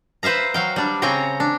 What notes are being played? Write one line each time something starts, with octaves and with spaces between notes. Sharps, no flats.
B4 C5 E5 F5 A#5
F#3 F5 G5
G3 D4
C#3 C4 C#5 G5 A#5
D4